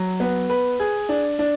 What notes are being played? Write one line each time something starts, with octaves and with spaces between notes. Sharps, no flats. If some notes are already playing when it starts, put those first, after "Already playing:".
Already playing: F#3
B3
B4
G#4
D4
D4